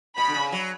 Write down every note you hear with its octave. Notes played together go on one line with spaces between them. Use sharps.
B2 B5
D3
C#3
F#3